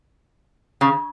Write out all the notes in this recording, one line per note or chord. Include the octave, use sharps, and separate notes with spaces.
C#3